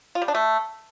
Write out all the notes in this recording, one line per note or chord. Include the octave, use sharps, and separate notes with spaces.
F4
G3
D4
A3